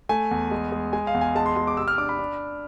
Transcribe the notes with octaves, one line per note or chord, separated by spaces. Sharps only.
A3 G#5
E2
G#3
G#3
G#3 G#5
F5
E2
G#5
G#3 A5
C6
G#3 C6
D6
C3 E6
F6
D4 D6
B5
D4